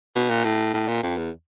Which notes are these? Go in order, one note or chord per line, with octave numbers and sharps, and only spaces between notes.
B2
A#2
A2
A2
A#2
F2
E2